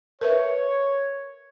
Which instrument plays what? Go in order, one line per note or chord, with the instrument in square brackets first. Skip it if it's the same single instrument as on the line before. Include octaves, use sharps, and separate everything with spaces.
[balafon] A#4 B4 E5 [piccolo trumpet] C#5